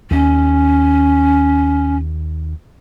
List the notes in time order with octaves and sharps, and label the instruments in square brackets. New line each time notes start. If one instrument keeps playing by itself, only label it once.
[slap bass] D#2 [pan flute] C#4